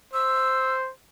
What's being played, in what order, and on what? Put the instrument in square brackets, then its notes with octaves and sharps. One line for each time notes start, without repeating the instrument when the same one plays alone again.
[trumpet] C5 [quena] E6